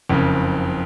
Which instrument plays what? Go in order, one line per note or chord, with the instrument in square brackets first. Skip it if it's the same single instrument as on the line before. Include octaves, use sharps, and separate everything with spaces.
[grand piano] F#1 F2 C#3